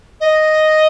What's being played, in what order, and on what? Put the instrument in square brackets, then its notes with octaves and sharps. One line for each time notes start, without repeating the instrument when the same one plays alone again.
[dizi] D#5